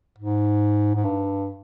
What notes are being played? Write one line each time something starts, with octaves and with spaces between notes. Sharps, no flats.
G#2
G#2
G2